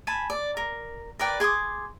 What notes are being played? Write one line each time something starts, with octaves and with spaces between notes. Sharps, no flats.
G#5 A5 B5
D5
A#4
A#4 B4 D5 G5
G#4 C6 D6 D#6